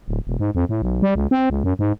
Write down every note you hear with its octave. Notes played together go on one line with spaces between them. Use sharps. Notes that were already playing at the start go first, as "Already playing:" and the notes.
D1
E1
G#2
F2
A2
B1
G3
C#2
C4
C#2
F#2
G#2